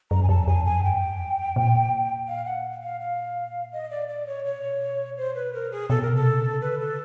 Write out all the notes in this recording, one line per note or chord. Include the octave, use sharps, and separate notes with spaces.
F#2 A#5
G#5
F2 A5
F2 G#5
F#2 G#5
G2 G5
F2
E2
F2
A#2
F5
F#5
F5
F5
D#5
D5
D5
C#5
B2 C#5
C5
B4
A#4
G#4
B2 A4
A#4
C3 A4
C#3
D3 B4
A4